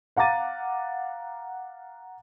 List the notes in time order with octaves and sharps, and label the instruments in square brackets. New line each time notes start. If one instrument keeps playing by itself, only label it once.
[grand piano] F5 F#5 A#5 D6 A6 D#7